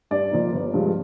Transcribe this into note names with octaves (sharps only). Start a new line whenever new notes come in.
G2 D5
F3 A#3 D#4
G1
G2 F3 G#3